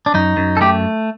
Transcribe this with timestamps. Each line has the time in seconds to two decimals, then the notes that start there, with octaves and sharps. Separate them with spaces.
0.06 D4
0.14 F#2 D#4
0.37 F#2
0.57 A4
0.61 A3 G4